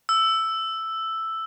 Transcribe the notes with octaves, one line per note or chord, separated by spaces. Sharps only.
E6